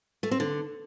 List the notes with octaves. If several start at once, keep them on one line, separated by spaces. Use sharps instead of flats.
A3
C4
D3